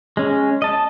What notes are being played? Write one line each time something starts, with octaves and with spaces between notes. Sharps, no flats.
G#3 C#4
D#5 A5